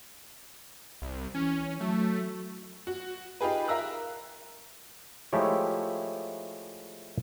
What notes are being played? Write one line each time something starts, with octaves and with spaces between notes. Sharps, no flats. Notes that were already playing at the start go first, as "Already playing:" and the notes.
C2
E3 C#4
F#3 A3
F#4
D#4 F4 G4 G#4 B4
A#4 E5 F5 A#5 E6 F#6
F3 G#3 A3 E4 G4 C#5